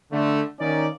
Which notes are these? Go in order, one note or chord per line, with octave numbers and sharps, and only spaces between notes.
D3 A3
D#3 A#3 C#4 D#4 D5